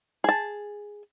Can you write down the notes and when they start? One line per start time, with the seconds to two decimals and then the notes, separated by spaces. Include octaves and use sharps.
0.24 G#4 A5